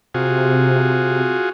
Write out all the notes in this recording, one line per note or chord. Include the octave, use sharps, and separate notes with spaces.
C3 F4 F#4 G#4